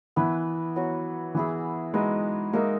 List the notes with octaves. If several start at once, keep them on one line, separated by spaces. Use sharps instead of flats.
E3 B3 E4 B4
F#3 B3 F#4
E3 B3 E4 G#4
G#3 D#4 F#4 B4
G#3 A#3 D#4 A#4 E5